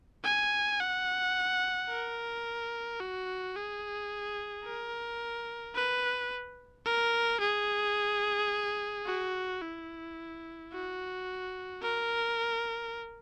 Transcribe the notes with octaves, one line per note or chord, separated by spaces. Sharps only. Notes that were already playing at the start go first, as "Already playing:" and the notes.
G#5
F#5
A#4
F#4
G#4
A#4
B4
A#4
G#4
F#4
E4
F#4
A#4